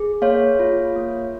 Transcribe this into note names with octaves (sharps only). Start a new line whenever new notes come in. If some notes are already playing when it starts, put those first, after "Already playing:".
Already playing: G#4
A#3 C#5 F5
F4
A#3